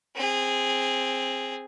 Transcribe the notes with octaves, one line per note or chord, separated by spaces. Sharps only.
C4 G#4